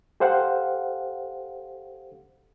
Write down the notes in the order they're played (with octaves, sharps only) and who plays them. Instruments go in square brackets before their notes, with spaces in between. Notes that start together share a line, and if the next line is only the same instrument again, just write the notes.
[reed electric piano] G4 A4 C5 F5 F#5